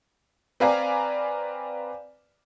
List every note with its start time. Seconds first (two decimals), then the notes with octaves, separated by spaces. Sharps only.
0.60 C4 B4 D5 F5 G#5 A#5